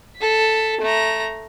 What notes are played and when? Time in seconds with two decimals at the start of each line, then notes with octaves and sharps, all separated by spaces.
0.17 A4 B6
0.81 A3 A#5